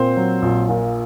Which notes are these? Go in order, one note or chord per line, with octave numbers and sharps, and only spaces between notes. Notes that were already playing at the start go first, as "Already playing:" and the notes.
Already playing: A#2 C4 C5
F#3
A#1
A#2